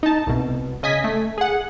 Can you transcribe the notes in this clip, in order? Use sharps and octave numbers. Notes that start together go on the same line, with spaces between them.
D#4 A5
C2 B2
C#3 D#5 G#5 G#6 B6
A3
G#4 F#5